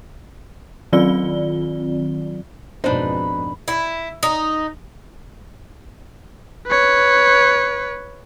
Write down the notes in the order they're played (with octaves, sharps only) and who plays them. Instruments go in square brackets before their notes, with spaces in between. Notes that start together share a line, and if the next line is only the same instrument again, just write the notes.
[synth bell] D#3 F#3 C4 F4 D5 G7
[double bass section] F2 G#2 B2 [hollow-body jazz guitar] D4 D#4 [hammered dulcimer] B4 B5 [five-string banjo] C5
[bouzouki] E4
D#4
[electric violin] B4 C#5